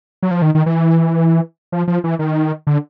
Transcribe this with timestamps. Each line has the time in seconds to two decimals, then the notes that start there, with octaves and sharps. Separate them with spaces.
0.23 F#3
0.31 F3
0.42 D#3
0.55 D#3
0.66 E3
1.72 F3
1.88 F3
2.04 E3
2.19 D#3
2.67 D3